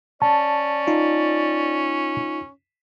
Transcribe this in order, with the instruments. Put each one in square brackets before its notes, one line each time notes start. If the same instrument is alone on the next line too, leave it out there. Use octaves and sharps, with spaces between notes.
[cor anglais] C#4 [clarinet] D5 [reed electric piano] A5
[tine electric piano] D#4 F4